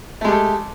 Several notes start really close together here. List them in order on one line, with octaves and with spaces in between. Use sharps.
A3 G#3 G4 A4